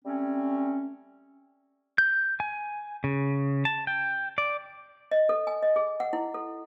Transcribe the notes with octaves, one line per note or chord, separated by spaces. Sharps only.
G3 A3 C4 C#4
G6
G#5
C#3
A5
G5
D5
D#5
A4
G#5
D#5
G#4
F#5
E4
A4